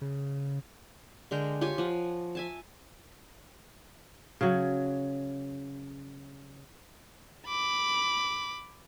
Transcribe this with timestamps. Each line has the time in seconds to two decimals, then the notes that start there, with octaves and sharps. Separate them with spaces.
0.01 C#3
1.31 D3 G#3 A#4 G5
1.61 F4 G4 C#5 G#5
1.78 F3 F#5
2.35 E5 G#5 A5
4.41 C#3 F#3
7.47 B5 D6